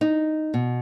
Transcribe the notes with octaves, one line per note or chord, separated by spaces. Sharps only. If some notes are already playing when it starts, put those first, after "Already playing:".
D#4
B2